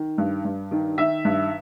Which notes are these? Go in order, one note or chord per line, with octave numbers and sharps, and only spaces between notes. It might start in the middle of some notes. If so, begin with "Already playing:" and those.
Already playing: D#3
G2
G2
D#3
D#3 E5
G2